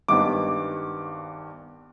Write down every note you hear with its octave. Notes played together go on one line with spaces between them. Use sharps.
G#1 G2 D#3 B3 D6